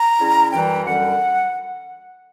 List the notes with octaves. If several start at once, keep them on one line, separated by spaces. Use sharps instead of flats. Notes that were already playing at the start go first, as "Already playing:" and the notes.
Already playing: A#5
C#3 G3 C#4 E4
F#2 E3 G3 G5
F#2 D3 G3 F#5